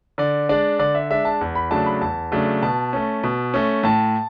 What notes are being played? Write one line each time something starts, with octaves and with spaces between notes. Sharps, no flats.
D3 D5
G#3 D4 D5
D3 D5
E5
G#3 D4 E5
A5
E2
B5
C#3 F#3 A3 D4 A5
B5
E2 A5
C#3 F#3 A3 D4
B2 A5
A3 C#4
B2
A3 C#4
A2 A5